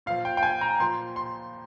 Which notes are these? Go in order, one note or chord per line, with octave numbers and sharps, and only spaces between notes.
A#2 F3 F5
G5
G5
G#5
A#5
A#2 F3 C6
C6